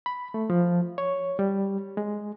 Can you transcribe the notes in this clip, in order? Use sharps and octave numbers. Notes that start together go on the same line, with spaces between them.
B5
A3
F3
C#5
G3
G#3